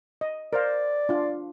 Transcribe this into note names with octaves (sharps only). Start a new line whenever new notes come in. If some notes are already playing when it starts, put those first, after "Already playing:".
D#5
A#4 C5 D5 F5
D4 F4